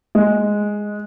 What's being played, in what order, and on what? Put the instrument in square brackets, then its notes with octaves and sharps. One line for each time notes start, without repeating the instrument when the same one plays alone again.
[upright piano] G#3